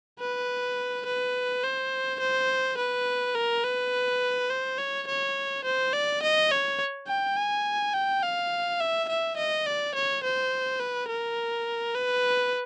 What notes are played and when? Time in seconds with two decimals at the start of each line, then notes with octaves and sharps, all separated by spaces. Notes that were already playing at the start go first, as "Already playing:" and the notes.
0.20 B4
1.06 B4
1.64 C5
2.20 C5
2.77 B4
3.35 A#4
3.64 B4
4.50 C5
4.78 C#5
5.07 C#5
5.65 C5
5.93 D5
6.22 D#5
6.51 C#5
7.08 G5
7.37 G#5
7.93 G5
8.23 F5
8.80 E5
9.09 E5
9.37 D#5
9.66 D5
9.95 C#5
10.23 C5
10.80 B4
11.09 A#4
11.95 B4